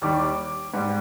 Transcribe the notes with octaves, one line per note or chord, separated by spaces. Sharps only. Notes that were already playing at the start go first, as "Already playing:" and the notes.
D#2 D#3 G3 D6
G#2 G3